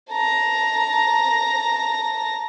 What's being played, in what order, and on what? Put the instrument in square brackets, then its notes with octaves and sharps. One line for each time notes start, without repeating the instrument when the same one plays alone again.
[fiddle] A5 A#5